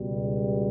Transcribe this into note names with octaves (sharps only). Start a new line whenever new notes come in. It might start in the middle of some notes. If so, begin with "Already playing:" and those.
Already playing: C#2 B2 G3